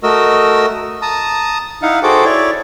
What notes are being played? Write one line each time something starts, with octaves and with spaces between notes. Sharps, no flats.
A3 F#4 A#4 D#5 E6
A5 A#5 D#6
D#4 E4 F5 F#5
F#4 G#4 A4 C5 G5 D6
E4 C#5 D5